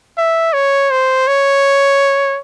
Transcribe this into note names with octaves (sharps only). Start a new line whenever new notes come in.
E5
C#5
C5
C#5